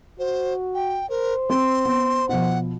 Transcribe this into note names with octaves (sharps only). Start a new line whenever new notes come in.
F#4 C5
G5
A#4 C5
C4 C6
B3
B2 F3 F#5